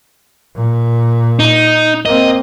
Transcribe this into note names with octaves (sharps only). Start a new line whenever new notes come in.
A#2
D#4
A#3 C4 D#5